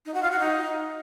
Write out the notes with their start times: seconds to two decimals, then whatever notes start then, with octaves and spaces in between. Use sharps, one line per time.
0.06 D#4
0.14 F#4
0.23 F4
0.31 F#4
0.39 D#4